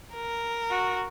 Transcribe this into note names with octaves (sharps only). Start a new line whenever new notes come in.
A#4
F#4